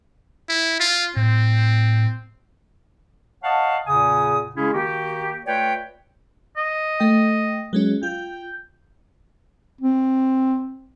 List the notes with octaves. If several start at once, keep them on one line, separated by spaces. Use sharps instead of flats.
E4
F4
A2 C4
C#5 D#5 F5 F#5 A5
E2 A#2 C#3 G#5 D#6
C#3 G#3 C#4 E4 G#4
D#3 A#3 F#4 G4
A3 F4 B4 C#5 D5 G5
D#5
A3 G5
F#3 G#3 C#4
F4 G5
C4